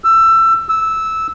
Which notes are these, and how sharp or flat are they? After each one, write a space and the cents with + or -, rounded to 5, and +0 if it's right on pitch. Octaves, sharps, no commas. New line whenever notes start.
E6 +20
E6 -10